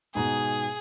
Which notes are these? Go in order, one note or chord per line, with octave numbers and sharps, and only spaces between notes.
G#2 B2 G#4 A#5